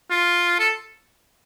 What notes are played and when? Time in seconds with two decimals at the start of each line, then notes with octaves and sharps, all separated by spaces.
0.10 F4
0.59 A4